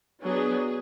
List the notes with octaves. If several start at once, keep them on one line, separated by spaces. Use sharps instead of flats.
F#3 B3 D4 G#4